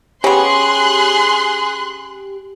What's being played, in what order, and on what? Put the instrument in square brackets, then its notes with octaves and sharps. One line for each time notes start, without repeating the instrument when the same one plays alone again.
[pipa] B3 C#4 [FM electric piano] G4 [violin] G#4 [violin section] C6 F#6